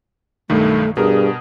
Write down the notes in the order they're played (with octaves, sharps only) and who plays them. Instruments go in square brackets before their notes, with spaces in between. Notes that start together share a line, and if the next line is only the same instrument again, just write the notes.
[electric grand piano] B1 G2 D#3 [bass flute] A3
[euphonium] G2 [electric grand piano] B2 A#4 D#6 [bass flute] G#4